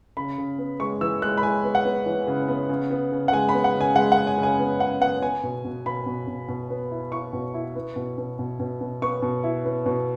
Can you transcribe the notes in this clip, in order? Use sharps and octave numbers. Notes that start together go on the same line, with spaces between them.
C#3 B5
C#3
B3
G#3 C#6
E3 E6
G#3 F#6
B5
G#3 G#5
B3
F#5
B3
E3
C#3
B3
C#3
B3
C#3
F#5
G#3 G#5
B5
B3
F#5
C#3
G#5
G#3 F#5
F#5
G#3
G#5
C#3
G#5
B3
C#3 F#5
B3 F#5
B3 G#5
B2
B2
B2 B5
B2
B2
B2
B3
E4
E4 C#6
B2
E4
B3
B2
B2
B2
B2
B2
B3 C#6
B2
E4
B3
B2